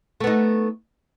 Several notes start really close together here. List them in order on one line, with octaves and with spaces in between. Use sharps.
A3 B3 D#4